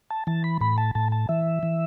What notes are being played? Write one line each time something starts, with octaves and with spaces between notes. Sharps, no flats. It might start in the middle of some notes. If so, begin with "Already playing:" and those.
A5
E3 A5
B5
A2 B5
A5
A2 A5
A5
E3 E5
E3